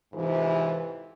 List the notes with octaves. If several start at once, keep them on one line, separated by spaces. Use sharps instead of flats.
F2 G#2 C3 E3